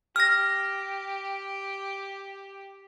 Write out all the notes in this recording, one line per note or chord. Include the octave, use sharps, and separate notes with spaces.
G4 F6 A#6